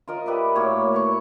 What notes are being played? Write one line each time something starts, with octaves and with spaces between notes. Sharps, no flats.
F4 A#4 D#5
G4 B4 D5 E5
A2 A#3 F#4 C#5
B4 C#5 C#6